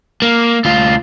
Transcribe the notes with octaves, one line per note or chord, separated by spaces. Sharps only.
A#3
D2 F4